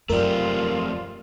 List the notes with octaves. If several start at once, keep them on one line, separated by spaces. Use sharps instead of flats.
E1 F#2 A3 C4 F4 G4 A#4 D5